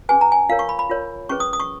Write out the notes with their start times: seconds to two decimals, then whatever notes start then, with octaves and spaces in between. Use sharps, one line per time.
0.09 C#4 G#4 B4 G#5
0.21 A#5
0.32 G#5
0.49 F4 A#4 C#5 F5
0.59 C#6
0.69 B5
0.79 B5
0.90 F4 A#4 C#5
1.29 C#4 G#4 B4 C#6
1.40 D#6
1.53 D#6
1.60 C#6